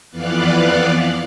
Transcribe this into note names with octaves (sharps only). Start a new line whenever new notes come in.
F2 E3 B3 D5 F5 F#6